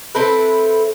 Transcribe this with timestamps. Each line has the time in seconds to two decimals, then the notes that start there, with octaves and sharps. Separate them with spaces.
0.15 C4 E4 A4 B4